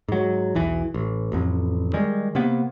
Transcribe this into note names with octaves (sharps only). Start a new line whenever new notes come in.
G#2 F#3
B1 E2 E3
A1
A1 F2
D#3 G3 G#3
C3 A#3 B3